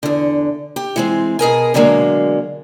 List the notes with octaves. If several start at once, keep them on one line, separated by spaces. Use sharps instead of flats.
E2 D3
G4
E3 G#3 C4
B2 G#4 A#4 G#5
B2 D3 F#3 G#3 A#3